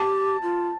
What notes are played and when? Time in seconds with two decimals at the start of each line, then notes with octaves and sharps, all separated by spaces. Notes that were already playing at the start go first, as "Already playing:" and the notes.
Already playing: G4 A5
0.43 F4